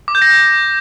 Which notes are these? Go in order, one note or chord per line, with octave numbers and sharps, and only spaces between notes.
D6
G6
A#6